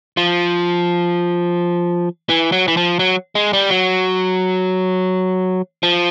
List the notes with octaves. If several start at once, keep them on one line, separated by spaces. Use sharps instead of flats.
F3
E3
F#3
E3
F3
F#3
G#3
G3
F#3
F3